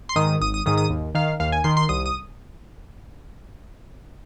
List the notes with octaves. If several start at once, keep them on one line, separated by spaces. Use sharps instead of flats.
C6
G#2 D#3 D#6
G#1 D#6
D#6
G#2 D#3 D#6
D#6
D#2
D#3 F5
D#2 F5
G#5
D#3 C6
C6
C2 D#6
D#6